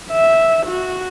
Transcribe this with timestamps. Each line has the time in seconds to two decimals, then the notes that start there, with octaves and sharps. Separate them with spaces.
0.11 E5
0.67 F#4